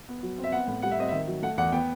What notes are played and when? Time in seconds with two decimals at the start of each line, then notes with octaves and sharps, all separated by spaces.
0.09 B3
0.23 F#3
0.38 C4
0.44 E5
0.52 B3 F#5
0.68 A2
0.82 G3 F#5
0.91 E5
0.98 C4 D#5
1.08 D#3 E5
1.27 F#3
1.43 A3 F#5
1.58 E2 F#5
1.72 B3 G5